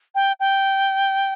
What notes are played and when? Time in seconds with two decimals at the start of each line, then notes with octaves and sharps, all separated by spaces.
0.15 G5
0.40 G5